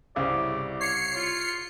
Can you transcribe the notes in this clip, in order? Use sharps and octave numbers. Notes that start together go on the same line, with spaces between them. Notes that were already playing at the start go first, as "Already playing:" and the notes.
C2 C#3 E4 D5
C#5 C7 C#7
F4